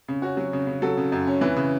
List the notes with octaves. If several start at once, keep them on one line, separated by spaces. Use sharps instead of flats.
C#3
C#4 F#4
F#3
C#3
C#3
F#3 A4
C#3
F#2
C#4
E3 B4
C#3